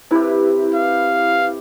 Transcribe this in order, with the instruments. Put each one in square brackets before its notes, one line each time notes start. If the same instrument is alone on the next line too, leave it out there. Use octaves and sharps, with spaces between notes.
[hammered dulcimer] C3 G4 [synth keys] E4 B4
[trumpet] F5